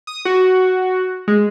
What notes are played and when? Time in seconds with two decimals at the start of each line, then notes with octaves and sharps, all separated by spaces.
0.07 D#6
0.25 F#4
1.28 G#3